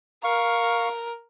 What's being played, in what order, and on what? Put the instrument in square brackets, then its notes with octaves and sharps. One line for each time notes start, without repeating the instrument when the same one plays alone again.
[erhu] A#4 [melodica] F5 C#6